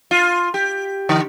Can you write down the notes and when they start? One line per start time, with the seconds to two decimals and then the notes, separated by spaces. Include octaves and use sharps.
0.11 F4
0.54 G4
1.09 D3